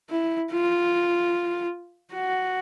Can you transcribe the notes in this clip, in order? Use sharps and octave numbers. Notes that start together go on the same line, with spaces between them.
E4
F4
F#4